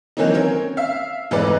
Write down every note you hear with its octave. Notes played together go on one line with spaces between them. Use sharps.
D#3 E3 F#3 A#3 C4 D#4
C4 C#4 A#4 C#5
E5 F5
F1 G#2 E3 A4 B4 D5